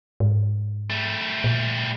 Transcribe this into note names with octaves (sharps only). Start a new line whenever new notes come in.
G#2
G3 A3
A#2